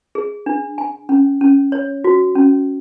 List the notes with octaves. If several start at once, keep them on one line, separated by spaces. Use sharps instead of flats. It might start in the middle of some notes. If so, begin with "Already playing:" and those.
G#4
D4
G#5
C#4
C#4
C#5
F#4
C#4